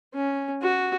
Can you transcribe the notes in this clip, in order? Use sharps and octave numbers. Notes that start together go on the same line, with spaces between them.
C#4
F#4